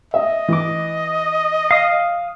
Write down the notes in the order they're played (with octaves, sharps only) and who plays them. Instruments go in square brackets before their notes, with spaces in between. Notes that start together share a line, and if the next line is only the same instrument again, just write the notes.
[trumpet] D#5 [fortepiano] E5
[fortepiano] E3 D6
[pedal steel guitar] F5 D#6